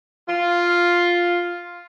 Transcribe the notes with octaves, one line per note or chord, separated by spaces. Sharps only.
F4